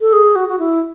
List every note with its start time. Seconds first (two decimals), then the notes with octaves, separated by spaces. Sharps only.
0.01 A4
0.13 G#4
0.36 F#4
0.49 F#4
0.59 E4